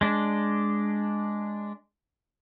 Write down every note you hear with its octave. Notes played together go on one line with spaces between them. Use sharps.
G#3 D4